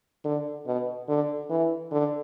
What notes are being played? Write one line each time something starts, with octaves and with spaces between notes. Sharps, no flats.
D3
B2
D3
E3
D3